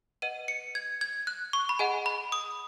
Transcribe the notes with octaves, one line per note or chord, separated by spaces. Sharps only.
B4 D#5 F#5 D#7
C#7
G#6
G#6
F#6
C#6
B5
G#4 D#5 F#5 G#5
B5
D#6